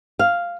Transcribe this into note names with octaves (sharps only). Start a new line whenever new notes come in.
F5